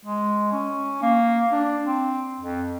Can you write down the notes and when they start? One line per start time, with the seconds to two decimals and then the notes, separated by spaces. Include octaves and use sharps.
0.05 G#3
0.52 C#4
1.02 A#3
1.52 D4
1.85 C4
2.41 F2